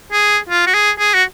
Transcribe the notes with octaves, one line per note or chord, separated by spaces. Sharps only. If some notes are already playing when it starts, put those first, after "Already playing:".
G#4
F4
F#4
G#4
G#4
F#4